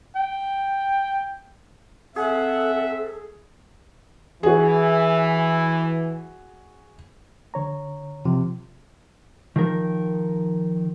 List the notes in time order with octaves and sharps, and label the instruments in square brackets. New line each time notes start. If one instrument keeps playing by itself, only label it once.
[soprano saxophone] G5
[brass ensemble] C4 E5 [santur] G#4 [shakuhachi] A4 [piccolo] F#5
[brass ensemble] E3 [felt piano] F#4 G#4
[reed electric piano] D3 C#5 A#5
[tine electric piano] C3 [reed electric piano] F3
[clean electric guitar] D#3 F3 D#4 A#4